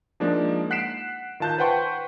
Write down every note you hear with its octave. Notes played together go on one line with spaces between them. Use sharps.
F3 G#3 A#3 D4 D#4
F#5 F#6 B6 C7 D7 E7
D#3 F4 A5 F#6 G6
B4 C5 F#5 G5 C6 C#6